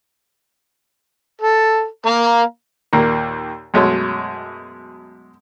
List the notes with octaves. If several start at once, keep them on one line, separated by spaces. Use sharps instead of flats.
A4
A#3 F5 A#5
D#2 A#2 A#3
F#2 B2 G#3 A3 C#5